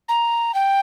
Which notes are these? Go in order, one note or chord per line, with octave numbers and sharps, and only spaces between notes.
A#5
G5